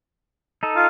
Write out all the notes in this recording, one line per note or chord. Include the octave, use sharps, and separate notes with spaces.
D#4 A4
F4